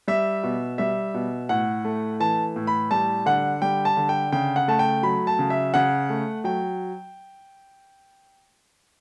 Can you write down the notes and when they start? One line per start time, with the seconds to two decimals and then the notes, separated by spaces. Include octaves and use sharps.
0.08 G3 E5
0.43 B2
0.78 G3 E5
1.14 B2
1.49 A2 F#5
1.85 A3
2.20 E3 A5
2.56 A2
2.67 B5
2.91 G3 A5
3.26 D3 F#5
3.62 G3 G5
3.85 A5
3.97 D3
4.09 G5
4.32 C#3 G5
4.56 F#5
4.68 A3 A5
4.79 G5
5.03 F#3 B5
5.27 A5
5.39 C#3
5.50 E5
5.74 C#3 F#5
6.10 A3
6.44 F#3 G5